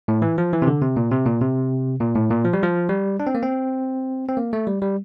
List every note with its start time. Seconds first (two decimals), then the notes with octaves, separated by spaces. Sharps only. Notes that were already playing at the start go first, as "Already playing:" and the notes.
0.08 A2
0.22 E3
0.38 F3
0.53 E3
0.62 C3
0.67 D3
0.82 C3
0.96 A#2
1.12 C3
1.26 A#2
1.41 C3
2.01 A#2
2.15 A2
2.31 A#2
2.44 F3
2.53 G3
2.63 F3
2.89 G3
3.20 D4
3.27 C4
3.35 A#3
3.43 C4
4.28 C4
4.37 A#3
4.53 A3
4.67 G3
4.82 G3